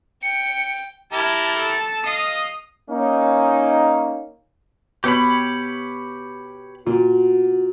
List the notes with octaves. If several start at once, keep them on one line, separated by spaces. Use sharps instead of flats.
G5 C#7
E4 G4 A#4 A5 G#6
A4 A5
D#5 F5 D#6
A#3 C#4 D#4
B2 G4 C#5 B5
A#2 F#4